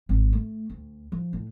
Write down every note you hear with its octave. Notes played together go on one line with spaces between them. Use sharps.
G#1
A3
D2
F3
A2